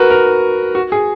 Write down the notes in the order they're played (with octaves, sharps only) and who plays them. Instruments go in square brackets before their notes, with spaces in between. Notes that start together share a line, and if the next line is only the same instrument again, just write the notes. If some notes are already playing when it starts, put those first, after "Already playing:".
Already playing: [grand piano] F#4 A#4 B4
A#4
F#4
G#4